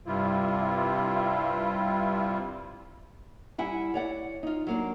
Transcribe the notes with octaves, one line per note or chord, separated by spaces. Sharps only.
G2 C3 G3 E4 F4
G3 E4 F#5 G#5
C#5 D5 F#5
D#4 F4
F#3 A#3 D4